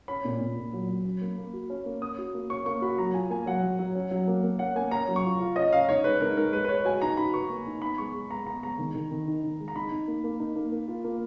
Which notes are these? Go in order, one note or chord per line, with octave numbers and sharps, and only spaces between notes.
C#4 B5
A#2
A#2
A#2
F#3
F#3
C#4
A#3
A#3
F#4
C#4
A#3
C#4 D#6
F#4
A#3
C#4 C#6
A#3 C#6
F#4 B5
F#3 A#5
F4 G#5
A#3 G#5
F#3 F#5
F#3
F#3
C#4
F#3
A#3
A#3
C#4 F#5
A#3 G#5
C#4 A#5
F#3
C#6
F4
F4
C#4 D#5
C#4 F5
D#4 C#5
G#3 B4
D#4 A#4
G#3 A#4
G#3 B4
B4
G#3 C#5
F#4 G#5
D#4 A#5
F#4 B5
B4 C#6
A#3
D#4
B3 B5
G#3 C#6
G#3
B3 A#5
B3 A#5
G#3 A#5
D#3
D#3
D#3
D#4
D#3
G#3
A#5
D#4 B5
D#4
A#3
A#3
D#4
A#3
A#3
F4
A#3